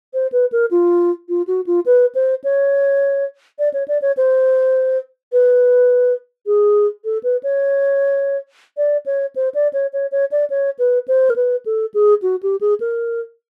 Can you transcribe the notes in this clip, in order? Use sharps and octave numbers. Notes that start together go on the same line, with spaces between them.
C5
B4
A#4
F4
F4
F#4
F4
B4
C5
C#5
D5
C#5
D5
C#5
C5
B4
G#4
A4
B4
C#5
D5
C#5
C5
D5
C#5
C#5
C#5
D5
C#5
B4
C5
A#4
B4
A4
G#4
F#4
G4
G#4
A#4